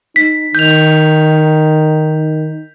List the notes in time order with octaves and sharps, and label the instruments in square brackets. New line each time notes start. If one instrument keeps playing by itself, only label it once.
[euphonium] D#4 [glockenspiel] B6
[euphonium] D#3 [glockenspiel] G6 F7